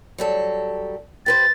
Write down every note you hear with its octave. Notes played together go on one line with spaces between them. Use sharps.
F#3 G3 A4
G4 B4 C5 A6